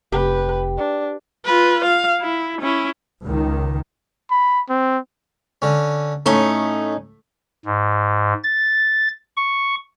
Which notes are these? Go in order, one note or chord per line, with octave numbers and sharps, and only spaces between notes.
F1 G4 B4
D4
F4 B4
F5
E4
C#4 E4
C#2 D#3
B5
C4
D3 C#4
A2 A3 C#4 D#4
G#2
A6
C#6